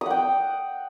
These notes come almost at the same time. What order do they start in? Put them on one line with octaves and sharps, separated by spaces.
D#6 F#5 G5